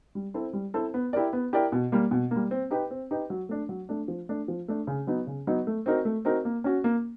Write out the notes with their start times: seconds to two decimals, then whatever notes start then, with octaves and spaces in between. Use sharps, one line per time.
0.15 G3
0.34 C4 E4 A4 C5
0.53 G3
0.74 C4 E4 A4 C5
0.94 B3
1.13 E4 G4 A#4 D5
1.33 B3
1.53 E4 G4 A#4 D5
1.72 B2
1.92 G3 A#3
2.11 B2
2.31 G3 A#3
2.51 C4
2.71 D#4 G4 B4
2.91 C4
3.11 D#4 G4 B4
3.30 F#3
3.49 A3 D4
3.69 F#3
3.89 A3 D4
4.08 F3
4.29 A3 D4
4.48 F3
4.68 A3 D4
4.87 C#3
5.07 F#3 B3 D#4
5.27 C#3
5.47 F#3 B3 D#4
5.67 A3
5.86 C4 D#4 F#4 A#4
6.05 A3
6.25 C4 D#4 F#4 A#4
6.45 A#3
6.64 C#4 F#4
6.84 A#3